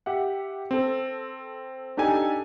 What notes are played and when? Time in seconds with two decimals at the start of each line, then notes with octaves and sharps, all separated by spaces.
0.06 G4 E5 F#5
0.71 C4 A4
1.97 D4 D#4 G4 A4 G#5